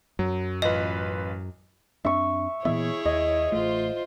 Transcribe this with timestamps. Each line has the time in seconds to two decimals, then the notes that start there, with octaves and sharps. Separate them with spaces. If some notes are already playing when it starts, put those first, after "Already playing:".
0.19 F#2 F#3
0.62 A1 F4 B4 D#5
2.05 F#2 C4 D4 E5 C#6
2.65 A#2 E3 B3 E4 G#4 C#5 E5
3.05 D#2 D#5
3.52 A1 A3 F4 C5